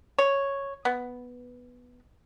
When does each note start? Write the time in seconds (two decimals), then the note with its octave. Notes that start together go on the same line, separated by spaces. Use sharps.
0.19 C#5
0.85 B3